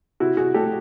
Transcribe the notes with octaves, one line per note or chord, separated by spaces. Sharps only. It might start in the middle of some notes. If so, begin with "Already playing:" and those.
C3 E4 F#4
C3 F#4 G#4
A3 G4 A4